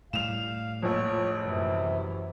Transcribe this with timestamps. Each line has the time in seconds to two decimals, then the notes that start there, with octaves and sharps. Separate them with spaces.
0.13 A2 G3 F5 E7 F7
0.83 A#1 F2 C#5
1.43 F#2 C3 E3